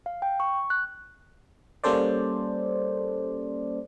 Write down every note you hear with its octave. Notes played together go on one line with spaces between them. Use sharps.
F5
G5
C#6
F#6
G3 A#3 C#4 A4 C5 D5